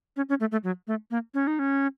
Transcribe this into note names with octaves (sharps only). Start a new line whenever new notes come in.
C#4
C#4
A3
A3
F#3
A3
A#3
C#4
D#4
C#4